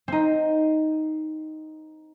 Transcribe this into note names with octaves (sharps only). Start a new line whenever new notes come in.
C4 D#4